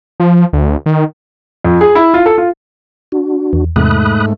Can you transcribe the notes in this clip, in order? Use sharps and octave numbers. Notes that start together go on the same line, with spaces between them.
F3
D2
D#3
F2
G#4
E4
F4
A4
F4
D4 F#4
E2
E2 G#2 C3 G#3 A3 B5 D#6 F#6